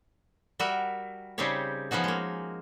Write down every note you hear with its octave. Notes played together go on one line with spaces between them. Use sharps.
G3 F#4 A#4 E5
C#3 G3 C4 D#4 G4 C#5
F3 B3 C#4 D#4 F#4
G#3 A#3